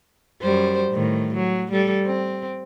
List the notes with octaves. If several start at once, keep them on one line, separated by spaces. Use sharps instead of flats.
F#2 G3 C5
A2 D#3
F#3
G3 A4
C4